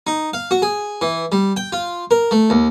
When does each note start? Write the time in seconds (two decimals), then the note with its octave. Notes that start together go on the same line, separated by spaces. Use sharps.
0.07 D#4
0.33 F5
0.51 F#4
0.62 G#4
1.01 E3
1.32 G3
1.57 G5
1.72 F4
2.11 A#4
2.31 A3
2.50 D#2